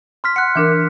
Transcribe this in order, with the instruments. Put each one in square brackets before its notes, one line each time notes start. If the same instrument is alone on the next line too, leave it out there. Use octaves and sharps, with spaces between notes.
[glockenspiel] C6 F6 B6
[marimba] F#5 [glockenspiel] F#6 C#7
[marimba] E3 D4 A#4